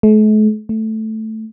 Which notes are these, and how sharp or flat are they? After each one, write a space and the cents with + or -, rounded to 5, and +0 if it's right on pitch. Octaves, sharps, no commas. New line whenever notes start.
A3 -45
A3 +0